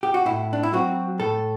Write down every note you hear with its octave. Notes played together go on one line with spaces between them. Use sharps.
G4
F#4
A2 E4
D4
E4
F#3 C4 F#4
A2 A4